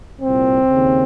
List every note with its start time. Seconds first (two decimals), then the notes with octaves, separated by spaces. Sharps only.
0.22 C2 A#2 C4
0.69 D#2 C#3